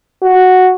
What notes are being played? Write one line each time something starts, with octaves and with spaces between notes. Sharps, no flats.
F#4